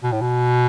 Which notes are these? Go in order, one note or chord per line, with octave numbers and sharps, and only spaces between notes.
B2
A2
B2